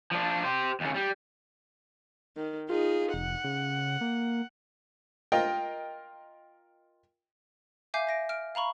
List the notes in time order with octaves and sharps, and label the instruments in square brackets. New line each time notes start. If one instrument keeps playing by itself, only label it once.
[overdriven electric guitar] F3 D4
G4 C5
D#2 C#3
G3
[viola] D#3
[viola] D#4 G#4 [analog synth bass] F4
[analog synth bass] F1 [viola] F#5
[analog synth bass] C#3
A#3
[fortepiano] F4 A#4 D#5 G5
[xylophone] E5 F5 G#5 D6 G6 C7
E5 A#6 D7
F6 D7
F5 A#5 B5 C#6